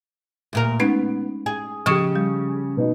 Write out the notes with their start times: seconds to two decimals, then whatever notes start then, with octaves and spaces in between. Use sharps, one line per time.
0.53 D2 A#2 A#4
0.80 G#3 B3 C#4 D#4
1.46 G#4
1.86 C#3 F3 G4 C#6 D#6 C#7 E7
2.16 G3
2.77 B2 B3 D#4